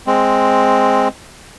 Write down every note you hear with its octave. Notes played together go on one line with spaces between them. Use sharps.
G#3 C4